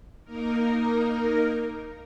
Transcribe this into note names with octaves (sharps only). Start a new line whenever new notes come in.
A#3 D#4 A#4